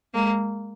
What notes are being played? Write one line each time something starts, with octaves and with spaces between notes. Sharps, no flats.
G#3 A#3